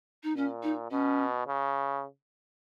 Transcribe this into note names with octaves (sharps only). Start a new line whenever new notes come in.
D#4
A#2 C#4
D#4
B2 C#4
C#3